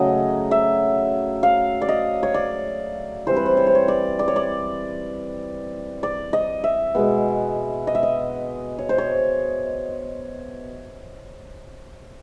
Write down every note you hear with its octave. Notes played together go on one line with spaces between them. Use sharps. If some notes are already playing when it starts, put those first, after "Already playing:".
Already playing: C#3 F#3 A3 D#5
E5
F5
D5
D#5
C#5
D5
E3 G3 C4 C5
B4
C5
C#5
C5
C#5
D5
D5
C#5
D5
D5
D#5
E5
B2 G#3 B3
D#5
E5
D#5
C#5
C5
C#5